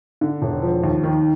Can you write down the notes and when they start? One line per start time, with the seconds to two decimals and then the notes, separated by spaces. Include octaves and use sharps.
0.21 D3
0.42 E1
0.62 F3
0.84 D#2
1.04 D#3